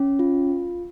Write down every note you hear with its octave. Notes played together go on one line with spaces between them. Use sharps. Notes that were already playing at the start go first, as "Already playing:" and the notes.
Already playing: C#4
F4